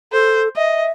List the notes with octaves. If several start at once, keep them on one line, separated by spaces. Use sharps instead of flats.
A4 C5
D#5 E5